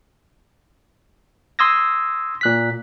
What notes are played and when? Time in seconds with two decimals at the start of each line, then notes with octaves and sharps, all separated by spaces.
1.59 C6 D#6 E6 G#6 A#6
2.41 A#2 F#6 B6